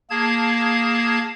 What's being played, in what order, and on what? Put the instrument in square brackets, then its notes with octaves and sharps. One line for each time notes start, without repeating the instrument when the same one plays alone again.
[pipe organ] A#3 G#4 A5 G#6